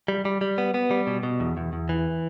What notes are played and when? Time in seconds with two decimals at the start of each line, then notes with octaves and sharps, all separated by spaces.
0.08 G3
0.25 G3
0.41 G3
0.58 B3
0.74 B3
0.91 G3
1.07 B2
1.23 B2
1.40 E2
1.57 E2
1.73 E2
1.89 E3